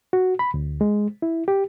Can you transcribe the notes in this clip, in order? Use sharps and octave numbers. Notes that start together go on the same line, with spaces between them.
F#4
B5
D2
G#3
E4
G4